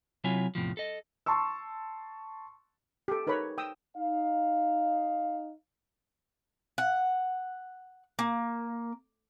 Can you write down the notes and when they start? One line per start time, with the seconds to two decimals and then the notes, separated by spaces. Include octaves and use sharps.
0.24 C3 F#3 E4 F4 C#5 G#5
0.55 E2 A2 C3 E3 F3
0.77 A4 D#5
1.26 A5 C6 C#6 E6
3.08 G4 A4
3.27 D#4 A#4 B4 C#5 B5
3.58 G5 D#6 E6
3.96 D#4 F5
6.78 F#5
8.19 A#3